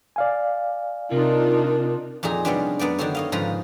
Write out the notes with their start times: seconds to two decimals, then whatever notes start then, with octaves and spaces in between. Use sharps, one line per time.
0.16 D5 F5 G#5
1.12 C3 D4 D#4 F4 A#4
2.23 F2 A#2 D#4 G#4 A#5
2.45 C3 G3 G#3 B3 C#4 D4
2.79 F#2 B3 D4 D5
2.98 D3 D#3 F#4 A4 C#5
3.15 C#5 D#5 F5
3.32 G#2 C#3 F3 B4 A#5